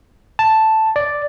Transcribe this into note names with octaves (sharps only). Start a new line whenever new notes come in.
A5
D5